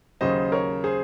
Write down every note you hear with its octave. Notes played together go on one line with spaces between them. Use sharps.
D#2 C#3 F#3 C5 D#5
A#4 C#5
G#4 C5